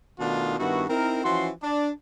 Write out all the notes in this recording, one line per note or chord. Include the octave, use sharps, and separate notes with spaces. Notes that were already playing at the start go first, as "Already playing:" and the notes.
B2 D#3 A3 D4 D#4 F4
G2 D#3 B3 E4 F#4
C4 D#4 E4 A#4
E3 F3 C#4 F#4 C6
D4